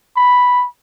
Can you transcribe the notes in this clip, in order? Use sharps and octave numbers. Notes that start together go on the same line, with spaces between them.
B5